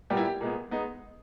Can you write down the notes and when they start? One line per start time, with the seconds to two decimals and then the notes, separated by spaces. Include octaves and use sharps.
0.10 A#2 G3 B3 G4
0.17 E4
0.25 G4
0.41 A#2 G#3 B3
0.71 G#3 B3 D#4